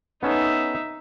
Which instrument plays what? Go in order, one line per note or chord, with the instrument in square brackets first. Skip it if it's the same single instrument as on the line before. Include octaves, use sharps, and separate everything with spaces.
[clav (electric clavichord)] B3 C#4 A4 [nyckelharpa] D#4 E5